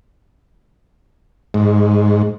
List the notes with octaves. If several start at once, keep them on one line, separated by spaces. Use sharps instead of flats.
G#2